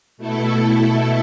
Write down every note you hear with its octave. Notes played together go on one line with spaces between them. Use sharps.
B2 A3 E4 A4